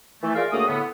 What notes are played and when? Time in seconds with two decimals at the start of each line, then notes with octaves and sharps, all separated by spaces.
0.23 E3 A3
0.35 F4 G#4 A#4 D5 E5 F5
0.52 D2 C#3 A3 A#3 A#4 D#6
0.67 A2 D3 B3